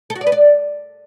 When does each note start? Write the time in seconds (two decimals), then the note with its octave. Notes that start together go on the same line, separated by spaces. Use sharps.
0.10 A4
0.16 F#4
0.21 D5
0.27 B4
0.32 D5